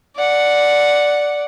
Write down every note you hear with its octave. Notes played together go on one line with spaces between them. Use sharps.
D5 F#5